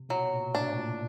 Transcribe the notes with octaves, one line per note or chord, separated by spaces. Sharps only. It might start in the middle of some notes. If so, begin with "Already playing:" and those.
Already playing: C3
B2 F#3
A#2
A2 D4
A2
A#2